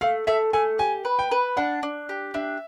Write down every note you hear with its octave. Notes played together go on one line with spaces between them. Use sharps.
A3 F5
A3 E5
A3 G#5
G4 G#5
B4
G5
B4
D4 F#5
D4
G4
D4 E5